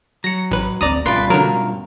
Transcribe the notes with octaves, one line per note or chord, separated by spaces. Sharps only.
F#3 A#6 C#7
A1 B4
D2 C4 D5 A#5 D#6
G2 B2 C#4 F4 B4 D5 C6
D3 F#3 A#4